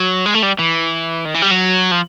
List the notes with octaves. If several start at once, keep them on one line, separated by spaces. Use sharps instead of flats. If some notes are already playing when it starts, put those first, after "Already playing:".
Already playing: F#3
G#3
A3
G3
E3
D#3
E3
G3
F#3
F3